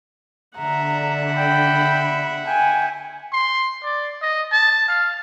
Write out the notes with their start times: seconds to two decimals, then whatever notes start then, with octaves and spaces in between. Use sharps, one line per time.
0.58 D3 E5 F#5 A#5
1.38 G5 B5
2.47 G5 G#5
3.33 C6
3.84 D5
4.22 D#5
4.52 A5
4.88 F5